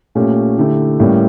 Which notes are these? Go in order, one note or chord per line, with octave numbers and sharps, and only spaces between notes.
A#2 A3 C#4 G4
D3 A3 E4 G4
A2 G3 A#3 C#4